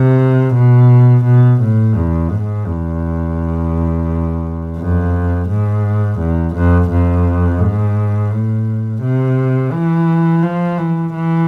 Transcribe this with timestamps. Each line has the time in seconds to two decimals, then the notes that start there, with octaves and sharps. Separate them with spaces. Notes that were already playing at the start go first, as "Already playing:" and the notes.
Already playing: C3
0.55 B2
1.25 B2
1.59 A2
1.96 E2
2.30 G#2
2.66 E2
4.78 F2
5.49 G#2
6.19 E2
6.55 F2
6.90 F2
7.59 G#2
8.31 A2
9.02 C3
9.72 E3
10.43 F3
10.78 E3
11.13 E3